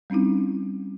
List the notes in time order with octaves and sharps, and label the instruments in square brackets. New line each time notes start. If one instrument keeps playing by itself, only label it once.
[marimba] G3 C4 C#4 D#4 E4